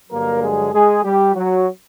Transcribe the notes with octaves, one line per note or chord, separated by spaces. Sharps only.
G2 D3 F#3 A#3 A#4
G#3 G#4
G#3 G#4
G3 G4
F#3 F#4